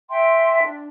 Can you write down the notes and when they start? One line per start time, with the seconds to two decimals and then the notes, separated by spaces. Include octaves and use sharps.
0.10 E5 G5 G#5 C6
0.61 D4